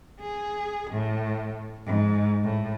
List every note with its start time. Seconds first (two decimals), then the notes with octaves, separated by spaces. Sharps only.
0.20 G#4
0.90 A2
1.86 G#2
2.44 A2